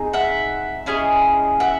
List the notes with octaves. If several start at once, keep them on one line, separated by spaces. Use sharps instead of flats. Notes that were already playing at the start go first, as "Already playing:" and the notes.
Already playing: C4 D#4 G#4
E5 F#5
C#4 E4 G#4 D#5 F5
E5 F#5